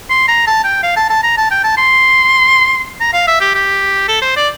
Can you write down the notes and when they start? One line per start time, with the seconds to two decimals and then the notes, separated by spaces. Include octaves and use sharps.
0.10 C6
0.28 A#5
0.47 A5
0.64 G5
0.83 F5
0.97 A5
1.10 A5
1.23 A#5
1.37 A5
1.51 G5
1.64 A5
1.78 C6
3.00 A#5
3.13 F5
3.27 E5
3.40 G4
3.55 G4
4.08 A4
4.22 C5
4.37 D5